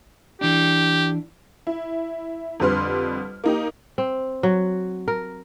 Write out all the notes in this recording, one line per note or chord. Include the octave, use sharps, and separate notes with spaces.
E3 D4 G4
E4
F2 D3 G3 B4 C6 F6
A#3 D#4 G4
C4
F#3
A#4